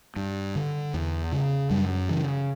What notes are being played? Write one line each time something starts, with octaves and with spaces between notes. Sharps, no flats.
G2
D3
E2
C#3
F#2 G3
C#3 E3